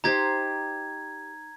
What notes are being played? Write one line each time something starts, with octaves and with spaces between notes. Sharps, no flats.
D#4 G4 C5 A#5 G#6